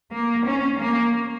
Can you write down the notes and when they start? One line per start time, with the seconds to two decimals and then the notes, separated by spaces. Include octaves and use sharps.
0.13 A#3
0.47 C#4
0.80 A#3